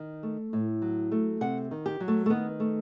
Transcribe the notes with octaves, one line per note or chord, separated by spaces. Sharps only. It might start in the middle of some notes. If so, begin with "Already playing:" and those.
Already playing: D#3
A3
A2
F#3
A3
C3 F#5
D#3
G4
F#3
A3
A3
D#3 B3
A3